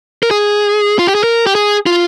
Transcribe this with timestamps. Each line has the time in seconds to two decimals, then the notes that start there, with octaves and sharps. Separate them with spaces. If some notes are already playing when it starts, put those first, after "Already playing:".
0.23 A#4
0.31 G#4
0.99 F4
1.07 G4
1.15 G#4
1.23 A#4
1.47 G4
1.55 G#4
1.86 F4